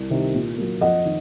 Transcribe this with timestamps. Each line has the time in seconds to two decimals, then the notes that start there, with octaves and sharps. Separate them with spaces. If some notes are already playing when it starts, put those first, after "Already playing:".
Already playing: C2
0.10 C3 D#3
0.34 A#2
0.58 F#3 A#3
0.81 F2 D#5 F#5
1.05 D#3